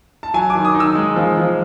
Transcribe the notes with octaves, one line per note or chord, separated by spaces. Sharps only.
A5
F#3 G#5
D6
D#3
D#6
D#4
E6
G#3
F3
F3